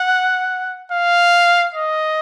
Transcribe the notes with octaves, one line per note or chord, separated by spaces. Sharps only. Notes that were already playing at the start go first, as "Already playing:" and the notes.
Already playing: F#5
F5
D#5